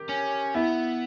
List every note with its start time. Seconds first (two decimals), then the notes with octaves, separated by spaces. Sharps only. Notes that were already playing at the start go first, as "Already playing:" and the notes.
Already playing: G4 A#4
0.09 C#4
0.55 B3 E4